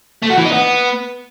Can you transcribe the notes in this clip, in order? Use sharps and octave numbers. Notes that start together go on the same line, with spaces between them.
A3
F#4
E3
D#4
B3